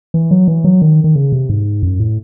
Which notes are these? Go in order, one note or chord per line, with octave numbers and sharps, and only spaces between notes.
E3
F#3
E3
F#3
D#3
D#3
C#3
C3
G#2
F#2
A2